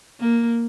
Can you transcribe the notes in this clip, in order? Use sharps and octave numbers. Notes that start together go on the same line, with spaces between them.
A#3